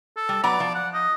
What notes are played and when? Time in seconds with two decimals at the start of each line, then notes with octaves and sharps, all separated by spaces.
0.17 A4
0.29 G3
0.44 F#3 B3 D5 A#5
0.60 F3
0.74 F#5
0.94 D#5